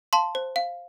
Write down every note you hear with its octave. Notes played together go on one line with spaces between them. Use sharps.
F5 A5 C6
C5
F5